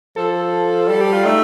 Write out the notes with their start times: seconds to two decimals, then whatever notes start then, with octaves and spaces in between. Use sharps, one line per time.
0.16 F3 A4
0.89 G3 A4
1.01 G4
1.13 F4
1.25 A3 D#4